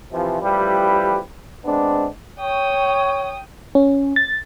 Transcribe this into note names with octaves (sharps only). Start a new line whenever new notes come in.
C3 E3 F3
A1 F3 G3 E4 G4 B4
G#3 B3 C4 D4
C#5 G5 D#6
C#4
A6